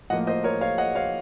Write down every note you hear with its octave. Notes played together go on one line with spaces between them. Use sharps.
A2 F3 A#3 D#5 F#5
C5 D#5
A#4 C#5
C#5 F5
D#5 F#5
C#5 F5